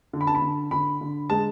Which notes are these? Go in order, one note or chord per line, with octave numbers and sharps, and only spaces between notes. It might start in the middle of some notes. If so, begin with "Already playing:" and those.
D3
B5
A5
B5
D3
D3 B5
D3
G#3 A5